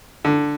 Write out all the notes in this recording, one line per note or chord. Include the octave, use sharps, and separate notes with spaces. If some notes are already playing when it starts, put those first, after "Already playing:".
D3